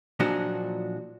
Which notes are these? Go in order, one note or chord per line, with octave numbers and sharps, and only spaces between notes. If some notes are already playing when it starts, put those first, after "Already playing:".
A#2 F3 F#3 D4 D#4 F#4